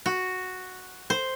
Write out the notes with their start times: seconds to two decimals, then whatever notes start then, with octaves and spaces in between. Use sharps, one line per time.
0.06 F#4
1.10 C5